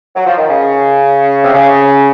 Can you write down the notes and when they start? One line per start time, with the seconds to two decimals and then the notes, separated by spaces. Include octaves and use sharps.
0.16 F#3
0.26 F3
0.38 D#3
0.49 C#3
1.43 C3
1.54 C#3